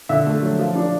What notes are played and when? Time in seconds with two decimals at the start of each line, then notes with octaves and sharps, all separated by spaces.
0.09 D3 E5
0.26 A3
0.42 F#3
0.59 F3
0.75 D4